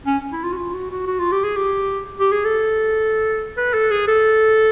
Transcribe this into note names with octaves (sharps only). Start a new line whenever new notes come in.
C#4
E4
F4
F#4
F4
F#4
F#4
F#4
F4
G4
G#4
G4
G4
G#4
A4
B4
A4
G#4
A4